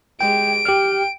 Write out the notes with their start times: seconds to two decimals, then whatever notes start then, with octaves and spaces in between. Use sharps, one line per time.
0.21 G#3 G4 G5 D7
0.65 G4 G5 F6